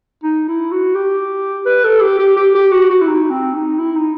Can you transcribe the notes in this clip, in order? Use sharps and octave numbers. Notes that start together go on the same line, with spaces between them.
D#4
E4
F#4
G4
B4
A4
G4
G4
G4
G4
F#4
F#4
E4
D#4
C4
D#4
E4
D#4